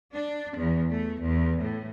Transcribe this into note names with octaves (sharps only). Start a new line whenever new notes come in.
D4
E2
A3
E2
A2